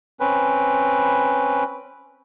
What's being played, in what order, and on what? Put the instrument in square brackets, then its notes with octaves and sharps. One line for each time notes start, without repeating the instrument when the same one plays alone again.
[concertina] C4 C#4 B4